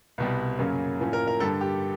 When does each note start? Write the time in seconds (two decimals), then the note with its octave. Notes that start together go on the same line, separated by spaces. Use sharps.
0.18 C2 B2 G3
0.59 F#2 C#3 F#3 A#3 C#4
1.00 A2 F3 A#3 C#4
1.13 A#4
1.27 A#4
1.40 G2 D3 G3 A4
1.61 G4